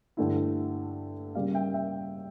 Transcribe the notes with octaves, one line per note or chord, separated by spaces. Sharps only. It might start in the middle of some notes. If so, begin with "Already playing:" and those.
G2 D3 A3 E4
C#3 G3 A#3 D5 F5
E5 G5
E5 G5